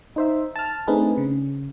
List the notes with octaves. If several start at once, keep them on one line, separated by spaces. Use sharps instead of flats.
D#4 C5 E5
A5 F6
A3 C4 D4 D#4 G#4 B4
C#3